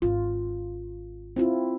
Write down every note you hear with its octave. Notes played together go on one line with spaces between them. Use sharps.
G#1 F4
C4 E4 F4